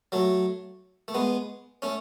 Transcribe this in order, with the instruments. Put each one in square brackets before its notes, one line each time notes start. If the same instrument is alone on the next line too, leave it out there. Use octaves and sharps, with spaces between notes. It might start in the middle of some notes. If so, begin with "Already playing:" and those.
[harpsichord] F#3 A3
A3
G#3 B3
A3 C#4